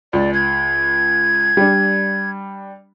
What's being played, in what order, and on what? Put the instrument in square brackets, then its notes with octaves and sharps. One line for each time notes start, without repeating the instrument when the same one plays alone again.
[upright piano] C#2 [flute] D5
[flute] G#6
[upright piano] G3 D4